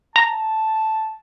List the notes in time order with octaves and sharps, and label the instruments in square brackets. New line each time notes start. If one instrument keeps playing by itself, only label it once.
[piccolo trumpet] A5 [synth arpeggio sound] A#5